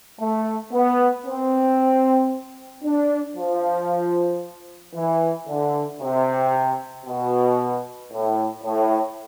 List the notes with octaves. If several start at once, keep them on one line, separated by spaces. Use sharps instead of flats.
A3
B3
C4
D4
F3
E3
D3
C3
B2
A2
A2